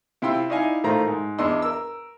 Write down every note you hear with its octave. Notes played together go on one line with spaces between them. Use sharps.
C3 E4 F4 G5 C6 E6
D#4 E4 D5 D#5 F5 G#5
A2 D#3 A3 F4 C5 A#5
G#2
E2 D4 D#5 C6 E6
A#4 E6